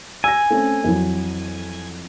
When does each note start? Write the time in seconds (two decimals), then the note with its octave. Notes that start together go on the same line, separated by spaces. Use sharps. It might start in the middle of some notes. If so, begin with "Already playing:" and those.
0.24 G#5 E6 A#6
0.50 A3 C4 C#4
0.84 F2 E3 F#3